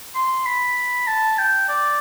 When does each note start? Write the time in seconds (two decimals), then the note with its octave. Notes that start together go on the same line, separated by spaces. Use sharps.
0.15 C6
0.46 B5
1.07 A5
1.38 G5
1.69 D5